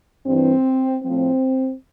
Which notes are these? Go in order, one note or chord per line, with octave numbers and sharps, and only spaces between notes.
G2 E3 C4
A2 F3 C4